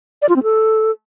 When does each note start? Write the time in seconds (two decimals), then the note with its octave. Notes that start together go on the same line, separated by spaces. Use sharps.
0.22 D5
0.29 F4
0.36 C4
0.43 A4